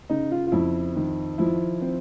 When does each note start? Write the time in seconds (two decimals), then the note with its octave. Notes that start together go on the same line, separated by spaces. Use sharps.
0.10 C#3 D#4
0.31 F4
0.47 F4
0.52 F2 E4
0.96 D#3
1.38 F3 E4
1.81 C4